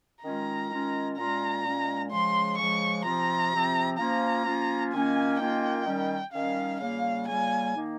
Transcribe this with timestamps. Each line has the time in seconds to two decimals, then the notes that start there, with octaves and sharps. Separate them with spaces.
0.23 D#3 G#3 C#4 F4 A#5
0.70 D#3 G#3 C#4 F4
1.17 A#2 G#3 C#4 F4 A#5
1.65 A#2 G#3 C#4 F4
2.11 C#3 F3 G#3 C6
2.58 C#3 F3 G#3 C#6
3.05 C3 F3 C4 F4 A#5
3.51 C3 F3 C4 F4
3.98 F3 A#3 C#4 F4 A#5
4.46 F3 A#3 C#4 F4
4.93 D#3 A#3 C#4 F4 G#5
5.40 D#3 A#3 C#4 F4 G5
5.86 D#3 G3 C#4
6.33 D#3 G3 C#4 F5
6.80 C#3 G3 A#3 F4 F5
7.27 C#3 G3 A#3 F4 G#5
7.74 D#3 A#3 D#4